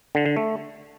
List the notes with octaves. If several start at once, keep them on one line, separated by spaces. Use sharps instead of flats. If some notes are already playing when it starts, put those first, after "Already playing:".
D3
D3
A3